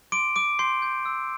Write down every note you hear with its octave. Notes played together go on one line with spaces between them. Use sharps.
C6 D6 D7
C6 D6 D7
C6 G6 C7
G6
E6